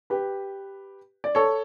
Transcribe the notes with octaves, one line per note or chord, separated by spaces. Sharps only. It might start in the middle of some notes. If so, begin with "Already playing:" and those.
G4 B4
D5
A4 C#5